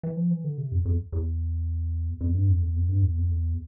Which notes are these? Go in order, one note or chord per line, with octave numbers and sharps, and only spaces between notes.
E3
F3
E3
D3
C3
F2
F2
E2
F2
G2
F2
E2
F2
G2
E2
F2
E2